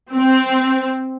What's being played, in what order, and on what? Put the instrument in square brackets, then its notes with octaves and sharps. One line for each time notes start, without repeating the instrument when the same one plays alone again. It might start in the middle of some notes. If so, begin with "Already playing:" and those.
[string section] C4